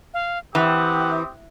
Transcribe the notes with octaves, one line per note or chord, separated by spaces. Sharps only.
F5
E3 C4 G4 F#5 D#6